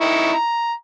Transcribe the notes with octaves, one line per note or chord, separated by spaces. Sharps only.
D#4 E4 C#6
A#5